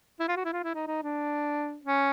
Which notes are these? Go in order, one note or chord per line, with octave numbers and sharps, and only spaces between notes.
E4
F4
F#4
E4
F4
E4
D#4
D#4
D4
C#4